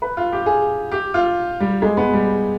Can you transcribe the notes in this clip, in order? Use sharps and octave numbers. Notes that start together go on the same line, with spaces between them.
B4
F4
G4
G#4
G4
F4
G3
G#3
B3
G3